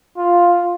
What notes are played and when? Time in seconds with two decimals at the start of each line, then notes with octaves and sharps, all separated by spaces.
0.17 F4